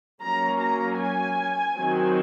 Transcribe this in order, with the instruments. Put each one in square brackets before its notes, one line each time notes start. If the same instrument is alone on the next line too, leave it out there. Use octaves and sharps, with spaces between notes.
[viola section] F#3 A#3 C#4 A#5
A#5
G#5
D#3 F#3 C4